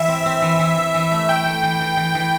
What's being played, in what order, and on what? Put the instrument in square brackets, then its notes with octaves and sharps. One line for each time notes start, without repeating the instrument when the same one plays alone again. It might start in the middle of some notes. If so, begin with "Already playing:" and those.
Already playing: [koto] E3 [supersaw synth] E5
[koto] C4
C4
E3
E3
E3
E3
A3
[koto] A3 [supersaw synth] G5
[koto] A3
E3
E3
E3
E3